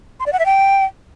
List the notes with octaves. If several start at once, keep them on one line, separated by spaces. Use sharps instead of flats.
C6
D5
F#5
E5
G5